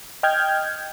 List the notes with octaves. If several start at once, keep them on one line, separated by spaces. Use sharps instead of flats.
D#5 G5 F6 G6 G#6